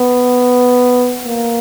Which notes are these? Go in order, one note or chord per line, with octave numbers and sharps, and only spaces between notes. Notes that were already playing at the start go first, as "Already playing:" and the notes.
Already playing: B3
A#3